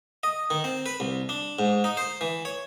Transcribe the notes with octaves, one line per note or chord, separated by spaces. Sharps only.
D#5
D#3
C4
B4
C2
D4
G#2
D#4
C5
E3
C#5